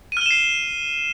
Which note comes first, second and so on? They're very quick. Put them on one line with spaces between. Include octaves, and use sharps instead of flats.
D#7 F6 G7 E7 C7